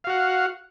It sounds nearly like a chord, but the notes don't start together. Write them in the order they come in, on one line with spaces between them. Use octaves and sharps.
F5 F#4 F#5